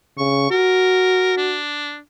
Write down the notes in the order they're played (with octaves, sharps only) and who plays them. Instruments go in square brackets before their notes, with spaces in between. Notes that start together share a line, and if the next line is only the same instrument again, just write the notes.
[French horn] C#3 [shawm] C#6
[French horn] F#4 [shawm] A#4
[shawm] D4